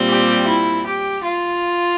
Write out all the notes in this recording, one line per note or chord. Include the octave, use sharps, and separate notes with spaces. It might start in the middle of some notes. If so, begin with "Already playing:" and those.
Already playing: A#2 G3 C4
G4
E4
G4
F4